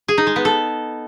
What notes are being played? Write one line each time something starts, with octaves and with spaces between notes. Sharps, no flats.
G#4
D#4
G#3
B3
A4